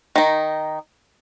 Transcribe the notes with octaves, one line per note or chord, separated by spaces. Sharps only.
D#3 D#4